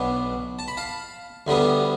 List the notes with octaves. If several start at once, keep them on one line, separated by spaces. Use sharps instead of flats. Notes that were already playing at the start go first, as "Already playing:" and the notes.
Already playing: B1 B2 B3 D4
A5
B5
F5 A5
D2 D3 G3 B3